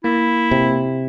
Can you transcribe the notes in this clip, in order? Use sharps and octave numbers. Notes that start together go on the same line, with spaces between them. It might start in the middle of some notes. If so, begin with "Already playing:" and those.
A#3 E4
C3